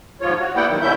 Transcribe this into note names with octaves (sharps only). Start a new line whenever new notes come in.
D#2 G#2 F3 F4 C#5
F#4
G3 A#3 B3 E4 F#5 G5
F#2 D#3
B2 D3 C#4 E4 E5 G6